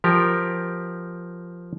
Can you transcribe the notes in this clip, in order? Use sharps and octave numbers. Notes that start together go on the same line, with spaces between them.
F3 G4 A#4